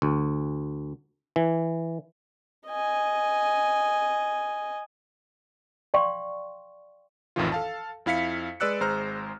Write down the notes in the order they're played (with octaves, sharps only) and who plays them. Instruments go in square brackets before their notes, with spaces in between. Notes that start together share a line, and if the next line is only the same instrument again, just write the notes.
[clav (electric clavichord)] D2
E3
[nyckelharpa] D#5 G#5
[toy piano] D5 F5 G5 C6 C#6
[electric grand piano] A1 F2 A2 D#3 E3 F4
A4 F5 A5
F2 E4 F5 B6 C#7
G#3 B4 D5 E6 F#6 C#7
G#1 G#3 C5 A#5 F6